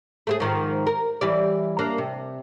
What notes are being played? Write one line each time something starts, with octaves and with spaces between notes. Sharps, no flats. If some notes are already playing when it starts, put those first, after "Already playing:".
A3 C4 G#4
G#2 D#3 F3
A#4
E3 G3 D5
A#3 D4
C3